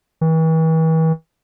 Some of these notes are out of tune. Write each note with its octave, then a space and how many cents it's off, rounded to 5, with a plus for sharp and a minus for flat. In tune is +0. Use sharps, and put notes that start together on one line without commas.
E3 -40